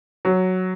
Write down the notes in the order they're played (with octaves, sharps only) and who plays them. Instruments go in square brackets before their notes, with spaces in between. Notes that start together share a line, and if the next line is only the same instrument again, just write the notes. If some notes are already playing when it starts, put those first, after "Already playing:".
[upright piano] F#3